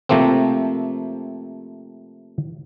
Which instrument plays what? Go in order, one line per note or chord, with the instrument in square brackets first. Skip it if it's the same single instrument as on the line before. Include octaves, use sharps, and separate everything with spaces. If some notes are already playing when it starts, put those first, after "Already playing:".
[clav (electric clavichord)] C3 F3 A3 A#3 C4